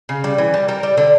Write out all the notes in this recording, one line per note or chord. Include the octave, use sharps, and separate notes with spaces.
C#3
G3
E3
G3
G3 A#4
G3
D3